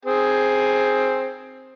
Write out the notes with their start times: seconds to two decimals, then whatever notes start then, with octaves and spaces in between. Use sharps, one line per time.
0.05 C4 G#4